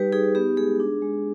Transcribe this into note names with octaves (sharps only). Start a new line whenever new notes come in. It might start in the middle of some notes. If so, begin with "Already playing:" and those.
Already playing: G3 D#4 G4 B4
D#4 G#4
B3 G4
G#3 G#4
D4
G#3